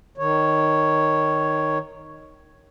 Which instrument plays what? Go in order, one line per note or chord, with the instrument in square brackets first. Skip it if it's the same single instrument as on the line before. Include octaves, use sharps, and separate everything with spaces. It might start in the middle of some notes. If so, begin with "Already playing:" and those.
[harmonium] D#3 C#5